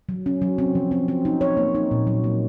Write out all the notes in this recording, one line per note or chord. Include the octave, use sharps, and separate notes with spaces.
F#3
C#4
F#3
C4
F3
C4
C4
D#4
C#5
A#3
D#4
A#2
F#3
A#3